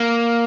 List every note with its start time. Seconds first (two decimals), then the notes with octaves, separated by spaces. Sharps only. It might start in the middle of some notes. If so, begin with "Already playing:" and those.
Already playing: A#3